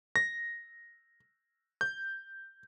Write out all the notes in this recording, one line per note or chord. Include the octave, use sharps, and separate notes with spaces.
A#6
G6